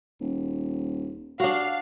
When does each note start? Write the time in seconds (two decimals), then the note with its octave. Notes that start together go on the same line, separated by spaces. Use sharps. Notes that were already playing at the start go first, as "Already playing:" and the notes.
0.20 D#1
1.40 D4 F#4 F5